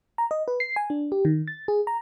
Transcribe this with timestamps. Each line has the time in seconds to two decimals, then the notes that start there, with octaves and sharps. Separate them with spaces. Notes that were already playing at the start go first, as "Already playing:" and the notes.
0.18 A#5
0.31 D#5
0.48 B4
0.60 C7
0.76 G#5
0.90 D4
1.12 G4
1.25 D#3
1.48 A6
1.68 G#4
1.87 A#5